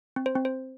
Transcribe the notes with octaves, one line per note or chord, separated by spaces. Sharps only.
C4
C5
C4
C5